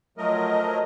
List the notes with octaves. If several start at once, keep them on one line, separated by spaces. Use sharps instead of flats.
F3 F#3 A3 A#4 D#5